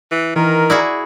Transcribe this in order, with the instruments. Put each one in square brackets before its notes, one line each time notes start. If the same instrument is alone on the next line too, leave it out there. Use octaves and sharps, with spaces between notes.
[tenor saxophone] E3
[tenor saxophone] D#3 [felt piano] E3 [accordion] A#4
[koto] E4 F#4 G#4 [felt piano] D5